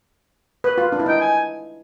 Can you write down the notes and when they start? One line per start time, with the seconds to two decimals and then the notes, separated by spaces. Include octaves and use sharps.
0.64 B4
0.78 F4
0.92 D4
0.99 E4
1.06 D#4 G5
1.21 G#5